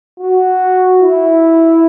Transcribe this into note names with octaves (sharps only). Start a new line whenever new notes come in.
F#4
E4